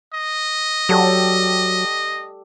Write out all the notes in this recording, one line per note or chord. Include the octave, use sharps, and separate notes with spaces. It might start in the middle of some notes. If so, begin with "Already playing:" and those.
D#5
F#3 G4 A4 D5